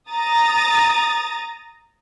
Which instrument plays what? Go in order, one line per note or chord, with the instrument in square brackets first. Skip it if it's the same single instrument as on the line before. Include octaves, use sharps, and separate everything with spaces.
[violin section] A#5 D#6 A6